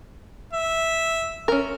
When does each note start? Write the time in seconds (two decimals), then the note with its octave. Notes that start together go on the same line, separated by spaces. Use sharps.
0.53 E5
1.48 C#4 A#4